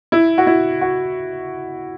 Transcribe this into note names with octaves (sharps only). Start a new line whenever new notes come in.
E4
F#4
E4
F#4